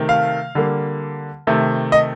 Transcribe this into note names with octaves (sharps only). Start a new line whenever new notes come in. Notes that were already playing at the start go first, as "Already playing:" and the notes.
Already playing: C3 D#3 A3
F5
D3 G3 A#3
C3 D#3 A3
D#5